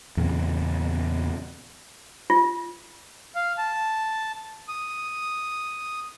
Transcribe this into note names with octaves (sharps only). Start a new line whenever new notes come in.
E2 A#2 C#3 C4
F4
F5
A5
D#6